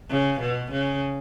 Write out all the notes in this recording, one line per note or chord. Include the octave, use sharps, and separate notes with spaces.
C#3
B2
C#3